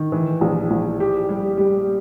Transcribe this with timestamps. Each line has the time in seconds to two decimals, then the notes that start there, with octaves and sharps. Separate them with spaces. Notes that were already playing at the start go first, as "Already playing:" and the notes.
Already playing: D#3
0.12 E3
0.41 A#1
0.71 A#1
1.00 G4
1.29 G3
1.58 G3